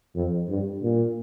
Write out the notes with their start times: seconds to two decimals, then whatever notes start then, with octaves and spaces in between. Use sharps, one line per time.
0.15 F2
0.49 G2
0.83 A#2